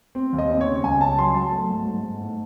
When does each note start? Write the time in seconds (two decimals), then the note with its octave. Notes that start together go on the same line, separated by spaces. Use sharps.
0.15 C4
0.33 D#2
0.38 D#5
0.50 C4
0.61 C#5
0.67 C#3
0.84 C#2 G#5
1.01 C#2 A5
1.18 F#3 C6
1.34 F#3 A5
1.52 A3
1.70 G#2
1.87 G#2
2.03 G#2
2.21 A2